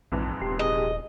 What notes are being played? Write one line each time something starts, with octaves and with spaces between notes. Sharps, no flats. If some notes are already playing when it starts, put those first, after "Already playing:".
A#1 F2 G#2 E3
D#1 G4 C6
G4 G#4 D#5